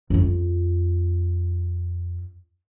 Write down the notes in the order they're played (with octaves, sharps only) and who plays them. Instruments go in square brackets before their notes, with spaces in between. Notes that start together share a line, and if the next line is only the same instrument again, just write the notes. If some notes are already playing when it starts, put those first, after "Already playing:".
[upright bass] F2 F4